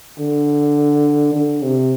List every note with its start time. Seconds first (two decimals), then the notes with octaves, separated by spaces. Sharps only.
0.19 D3
1.33 D3
1.62 C3